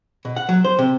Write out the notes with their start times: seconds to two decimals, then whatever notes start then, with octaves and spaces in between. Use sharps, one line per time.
0.25 B2
0.36 F#5
0.49 F#3
0.64 C5
0.79 C3